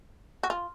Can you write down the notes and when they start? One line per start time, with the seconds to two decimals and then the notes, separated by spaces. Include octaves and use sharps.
0.43 F#4
0.50 F4